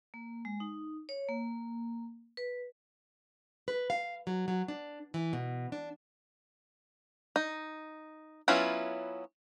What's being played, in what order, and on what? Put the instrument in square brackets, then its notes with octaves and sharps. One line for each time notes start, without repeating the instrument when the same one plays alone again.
[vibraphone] A#3
G#3
D#4
C#5
A#3
B4
[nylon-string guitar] B4
F5
F#3
F#3
D4
E3
B2
D4
[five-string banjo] D#4
F#3 B3 C#4 E4 F4